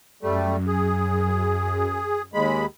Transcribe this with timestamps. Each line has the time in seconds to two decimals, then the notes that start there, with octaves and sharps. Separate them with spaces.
0.23 F#2 G3 A3
0.67 G#4
2.34 D#2 G#3 B5